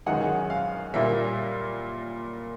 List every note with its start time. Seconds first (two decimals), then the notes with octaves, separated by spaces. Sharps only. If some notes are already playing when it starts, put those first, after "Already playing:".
0.06 F#2 D#3 G#3 F#5
0.50 F5
0.94 A#2 G3 A#3 E5